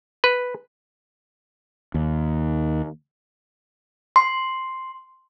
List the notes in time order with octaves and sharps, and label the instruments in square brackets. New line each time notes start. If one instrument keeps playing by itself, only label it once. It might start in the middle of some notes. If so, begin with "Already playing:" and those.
[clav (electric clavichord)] B4
[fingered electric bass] D#2
[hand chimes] C6